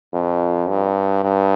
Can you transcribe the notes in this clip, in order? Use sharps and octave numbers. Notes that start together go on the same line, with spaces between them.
F2
G2
G2